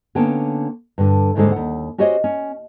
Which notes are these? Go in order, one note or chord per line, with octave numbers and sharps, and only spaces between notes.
D3 A#3 B3 C#4 G5 A5
G2 D3
D#2 G#2 D3 G#3 A4
D#2 F#5
C#4 F#4 G4 C5 C#5 D#5
C#4